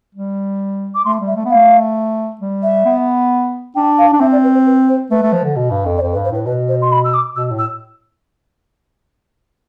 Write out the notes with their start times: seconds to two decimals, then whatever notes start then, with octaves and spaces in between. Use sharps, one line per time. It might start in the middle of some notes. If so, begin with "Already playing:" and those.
0.15 G3
0.95 D6
1.05 A3 C6
1.20 G3
1.27 E5
1.36 A3
1.45 B3 F5
1.56 A3
2.41 G3
2.63 E5
2.86 B3
3.75 D4 G5
3.98 F5
4.13 D4
4.20 C4 E5
4.32 D5
4.43 B4
4.54 C5
4.66 B4
4.89 C5
5.11 A3 B4
5.23 A3
5.33 F3
5.44 D3
5.56 B2
5.71 G2
5.86 F2
5.97 D5
6.01 F2 C5
6.12 B4
6.16 G2
6.24 C5
6.31 A2 B4
6.46 B2 B4
6.68 C5
6.82 C6
6.92 B5
7.04 E6
7.14 D6
7.36 B2 E6
7.51 A2
7.59 E6